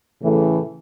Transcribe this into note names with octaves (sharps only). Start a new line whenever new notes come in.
A2 C#3 E3 A3